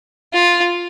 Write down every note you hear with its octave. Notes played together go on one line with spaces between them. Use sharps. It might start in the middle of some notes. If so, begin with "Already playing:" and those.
F4